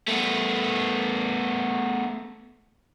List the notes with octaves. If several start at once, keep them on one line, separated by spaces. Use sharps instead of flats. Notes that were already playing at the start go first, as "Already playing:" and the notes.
A3 B3